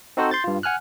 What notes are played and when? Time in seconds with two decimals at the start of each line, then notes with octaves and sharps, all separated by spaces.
0.17 C4 D#4 F#4 A4 C5
0.31 C6 G6 A6
0.44 G2 F4
0.63 F#5 G#5 F6 F#6